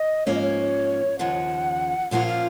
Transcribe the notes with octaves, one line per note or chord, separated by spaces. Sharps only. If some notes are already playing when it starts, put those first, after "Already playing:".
Already playing: D#5
G#2 F3 A#3 C#4 C#5
D#5
C#5
D#2 C#3 F3 F#5
A#2 F3 A#3 C#4 F4 F#5
F5